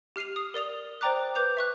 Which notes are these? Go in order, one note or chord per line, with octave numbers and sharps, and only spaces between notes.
G4 F6 C7 D#7 F7
D#6
A#4 D5 D#6 F7
C5 D5 G5 A#5 D6 F#6
B4 D6 G6 F7
E5 C#6 F#6